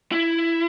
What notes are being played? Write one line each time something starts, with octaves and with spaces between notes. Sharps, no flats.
E4